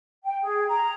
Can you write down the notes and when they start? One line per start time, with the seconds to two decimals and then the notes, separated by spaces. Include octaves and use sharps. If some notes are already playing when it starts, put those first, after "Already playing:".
0.24 G5
0.42 G#4
0.68 A#5